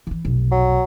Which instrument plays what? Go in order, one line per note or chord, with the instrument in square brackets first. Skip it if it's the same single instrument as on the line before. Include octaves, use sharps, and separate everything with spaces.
[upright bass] D#3 E3
F1 B1
[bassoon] F#3